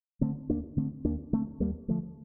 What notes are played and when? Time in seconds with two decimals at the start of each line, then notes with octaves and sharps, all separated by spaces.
0.21 D3 A3 C4
0.50 D#2 A#3 D4
0.77 D3 A3 C4
1.05 D#2 A#3 D4
1.33 D3 A3 C4
1.60 D#2 G3 A#3
1.88 D3 F3 A3